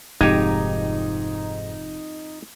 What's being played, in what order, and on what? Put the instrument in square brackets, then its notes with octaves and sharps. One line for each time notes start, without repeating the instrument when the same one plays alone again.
[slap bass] F1 [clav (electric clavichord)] F2 G4 [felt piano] G#2 G#6 D#7 [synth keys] D#4